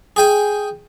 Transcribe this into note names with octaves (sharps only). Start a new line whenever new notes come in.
G#4 G5 G#5